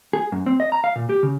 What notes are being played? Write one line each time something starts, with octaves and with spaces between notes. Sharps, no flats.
G#4
F#2
C4
D#5
A#5
F5
A#2
G4
C#3